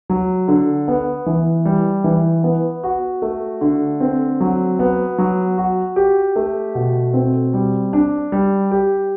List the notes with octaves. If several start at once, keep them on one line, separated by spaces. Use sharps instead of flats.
F#3
D3
B3
E3
G3
E3
B3
F#4
A3
D3
C4
F#3
B3
F#3
F#4
G4
A3
B2
C4
G3
D4
G3
G4